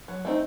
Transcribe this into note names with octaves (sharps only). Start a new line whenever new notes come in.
F#3
A3 C4 D#4